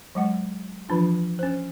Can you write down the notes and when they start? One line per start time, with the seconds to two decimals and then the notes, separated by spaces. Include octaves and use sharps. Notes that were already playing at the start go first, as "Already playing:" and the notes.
0.15 F#3 G#3 F#5
0.89 E3 F3 D4 F4
1.39 C#4 C5